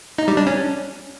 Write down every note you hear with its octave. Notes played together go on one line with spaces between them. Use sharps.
D#4
G3
D4
C#4